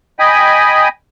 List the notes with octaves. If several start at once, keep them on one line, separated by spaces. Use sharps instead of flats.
D#5 G5 G#5 B5 D#6